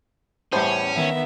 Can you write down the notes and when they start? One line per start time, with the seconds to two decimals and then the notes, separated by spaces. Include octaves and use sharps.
0.53 E2 A2 G3 C#4 C5
0.95 D#3 B3 E5